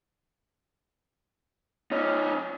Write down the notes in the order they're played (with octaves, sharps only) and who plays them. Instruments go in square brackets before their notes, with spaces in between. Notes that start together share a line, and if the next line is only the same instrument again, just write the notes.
[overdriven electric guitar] C#4 D#4